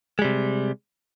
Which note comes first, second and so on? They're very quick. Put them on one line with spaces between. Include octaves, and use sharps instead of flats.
G#3 G3 C3